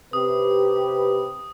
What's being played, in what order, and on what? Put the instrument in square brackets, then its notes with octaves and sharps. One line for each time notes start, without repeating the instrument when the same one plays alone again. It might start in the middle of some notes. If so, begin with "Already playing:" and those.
[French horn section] C3 G4 B4 [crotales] D#6